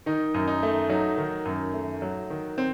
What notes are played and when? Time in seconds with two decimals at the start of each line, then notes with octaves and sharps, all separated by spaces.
0.06 D#3 D#4
0.34 F#2
0.48 D#4
0.63 A3
0.89 F#3 D#4
1.18 D#3
1.45 F#2
1.74 A3
2.02 F#3
2.30 D#3
2.58 C4